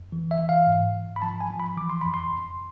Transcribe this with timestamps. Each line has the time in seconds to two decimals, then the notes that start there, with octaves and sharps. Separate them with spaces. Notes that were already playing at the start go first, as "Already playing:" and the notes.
Already playing: F2
0.12 E3
0.31 E5
0.39 E3
0.49 F5
0.67 G#2
0.95 G#2
1.16 B5
1.22 F3 A5
1.41 G#5
1.50 F3
1.60 B5
1.77 E3 D6
1.90 C6
2.01 F2 B5
2.14 C6
2.32 F2